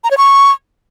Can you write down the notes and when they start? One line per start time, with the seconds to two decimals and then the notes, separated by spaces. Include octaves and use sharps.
0.04 A#5
0.11 C#5
0.17 C#6